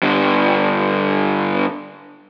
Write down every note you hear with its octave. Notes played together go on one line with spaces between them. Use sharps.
G2 D3